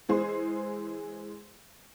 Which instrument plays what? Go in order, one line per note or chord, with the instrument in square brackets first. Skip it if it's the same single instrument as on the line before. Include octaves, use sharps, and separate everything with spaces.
[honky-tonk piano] E3 G#3 G#4 C5